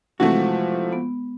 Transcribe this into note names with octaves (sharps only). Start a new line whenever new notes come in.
C3 E3 F3 G#3 A3 F#4
B3